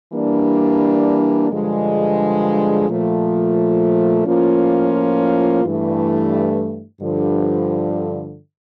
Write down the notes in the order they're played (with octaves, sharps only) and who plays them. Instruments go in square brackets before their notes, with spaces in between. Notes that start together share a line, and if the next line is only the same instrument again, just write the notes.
[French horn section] E3 G3 A#3 D4
G2 D3 F3 G#3
A#2 F3 A3
A2 F3 A#3 C#4 F4
G2 E3 A3
G2 D3 F3